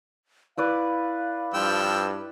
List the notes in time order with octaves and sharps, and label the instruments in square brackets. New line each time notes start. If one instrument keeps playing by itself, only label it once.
[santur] E4 B4 D5 [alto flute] F5
[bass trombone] G2 [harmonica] F3 G5 E6